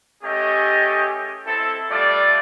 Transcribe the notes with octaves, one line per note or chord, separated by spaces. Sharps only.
A3 C#4 G4 G#4 D#5
C4 E4 A4
G3 A3 F4 D5